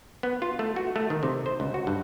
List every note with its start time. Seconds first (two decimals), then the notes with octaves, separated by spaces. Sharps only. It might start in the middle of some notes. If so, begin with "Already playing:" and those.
0.23 B3
0.42 F4
0.59 A3
0.76 F#4
0.96 A3
1.10 D#3
1.23 C3
1.46 C5
1.60 C#2
1.74 F#4
1.87 G2